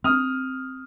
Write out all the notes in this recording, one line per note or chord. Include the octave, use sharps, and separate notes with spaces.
C4 D#6 F6